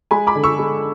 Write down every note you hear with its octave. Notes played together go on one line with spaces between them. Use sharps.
G#3 G#5 B5
B5 D6
D3
C#6 E6
G#3